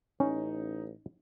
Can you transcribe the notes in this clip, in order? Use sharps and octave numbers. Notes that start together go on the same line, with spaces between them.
A1 C#4 D#4